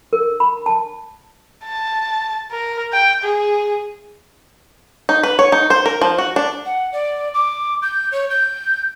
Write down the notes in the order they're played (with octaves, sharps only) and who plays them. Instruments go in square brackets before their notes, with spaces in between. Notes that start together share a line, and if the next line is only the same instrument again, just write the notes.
[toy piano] A#4
B5
A5
[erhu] A5
A#4
G5
G#4
[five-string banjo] D#4
B4
C#5
D#4
C5
A#4
F3
F#4
D4
[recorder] F#5
D5
D6
G6
C#5
G6